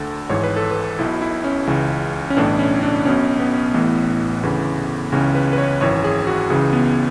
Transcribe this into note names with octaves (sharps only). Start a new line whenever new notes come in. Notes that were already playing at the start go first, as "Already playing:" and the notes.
Already playing: D2 D3 A4
G#1 G#2 E3 C#5
B4
A4
B4
B1 B2 E4
E4
C#4
C#2 C#3 E3
C#4
B1 A2 E3 D4
C#4
D4
B1 B2 C#4
B3
A1 A2 E3 B3
D2 C#3 E3
C#2 C#3 E3 C#4
B4
B4
C#5
G#1 F#2 E3 C#5
G#4
F#4
C#2 C#3 E3 G#4
B3